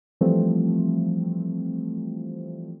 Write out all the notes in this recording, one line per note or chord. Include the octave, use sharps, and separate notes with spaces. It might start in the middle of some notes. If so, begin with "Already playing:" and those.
E3 F3 G3 A3 C4